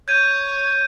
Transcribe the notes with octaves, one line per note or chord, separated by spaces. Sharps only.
C#5 G6 G#6 D#7